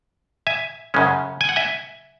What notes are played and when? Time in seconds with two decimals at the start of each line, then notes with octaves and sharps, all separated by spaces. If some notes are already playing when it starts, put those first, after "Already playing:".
0.47 E5 G#5
0.94 F#2 C#3 G#3 C#4
1.41 G#5
1.49 F#5
1.56 E5 G#5